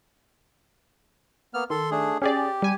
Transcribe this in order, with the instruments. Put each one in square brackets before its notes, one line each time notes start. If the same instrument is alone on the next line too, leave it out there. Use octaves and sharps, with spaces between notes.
[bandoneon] A#3 B3 F6
[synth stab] D#3 [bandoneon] A4 C6
[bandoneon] A3 D4 G#4
[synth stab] C#4 G#4 D5 [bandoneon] G4
[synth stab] G3 G#5